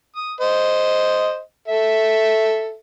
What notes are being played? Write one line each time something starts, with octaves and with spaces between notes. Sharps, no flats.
D#6
C5 D#5
A4 E5